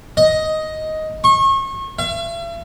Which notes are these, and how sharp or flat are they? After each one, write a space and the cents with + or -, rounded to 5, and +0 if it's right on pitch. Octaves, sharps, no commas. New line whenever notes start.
D#5 +10
C#6 -35
E5 +45